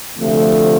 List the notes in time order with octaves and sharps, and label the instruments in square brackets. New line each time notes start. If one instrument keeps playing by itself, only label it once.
[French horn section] D2 C3 F3 A3